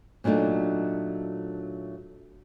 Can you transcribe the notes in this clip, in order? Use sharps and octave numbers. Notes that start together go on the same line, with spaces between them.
A#2 F#3 A3 D4 D#4